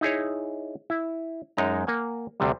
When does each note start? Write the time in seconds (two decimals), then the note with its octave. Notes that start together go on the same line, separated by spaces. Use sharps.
0.01 D#4 E4 G#4 C#5
0.90 E4
1.57 F#2 G#3 D#4 A#5
1.87 A#3 F#5 G#5
2.40 D2 C3 G3